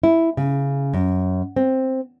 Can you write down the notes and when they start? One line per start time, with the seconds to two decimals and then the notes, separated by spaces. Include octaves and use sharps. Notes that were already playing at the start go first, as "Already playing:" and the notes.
0.03 E4
0.37 C#3
0.93 F#2
1.56 C4